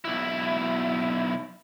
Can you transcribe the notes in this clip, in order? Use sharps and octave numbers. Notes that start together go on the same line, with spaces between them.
B1 E4